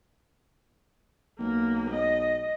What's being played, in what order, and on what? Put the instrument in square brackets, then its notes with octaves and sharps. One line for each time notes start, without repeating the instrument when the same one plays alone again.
[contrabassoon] B1 [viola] A#3
[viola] D#5